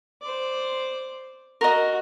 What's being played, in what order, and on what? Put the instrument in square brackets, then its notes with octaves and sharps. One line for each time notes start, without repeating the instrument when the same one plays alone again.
[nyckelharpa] C5 D5
[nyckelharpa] F#4 [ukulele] A#4 D#5